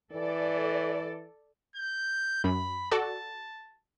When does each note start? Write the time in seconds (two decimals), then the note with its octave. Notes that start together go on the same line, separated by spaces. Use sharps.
0.12 E3 A4 D5
1.76 G6
2.44 F#2 B5
2.91 F#4 A4 D5 A5